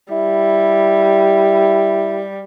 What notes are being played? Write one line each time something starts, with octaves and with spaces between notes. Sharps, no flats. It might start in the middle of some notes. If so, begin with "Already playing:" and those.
G3 E4